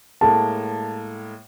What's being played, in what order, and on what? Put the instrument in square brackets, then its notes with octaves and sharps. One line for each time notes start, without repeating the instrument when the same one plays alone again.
[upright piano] A2 G#3 A#3 [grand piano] A5